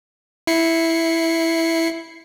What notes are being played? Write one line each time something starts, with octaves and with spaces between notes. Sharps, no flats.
E4 C7 C#7